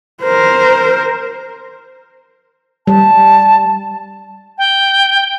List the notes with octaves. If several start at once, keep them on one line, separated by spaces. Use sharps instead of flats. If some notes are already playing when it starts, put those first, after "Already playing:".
A#4 C5
G3 A5
G5